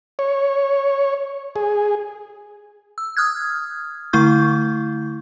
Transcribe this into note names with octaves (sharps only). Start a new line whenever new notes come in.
C#5
G#4
E6
D#6 F6 F#6 G#6
D3 A3 E4 C#6 G6